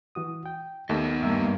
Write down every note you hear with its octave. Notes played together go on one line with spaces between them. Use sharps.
E3 F#4 D#6
G5
D#2 A3 B3 D#4 D#5
G2 A#3 E5 A#5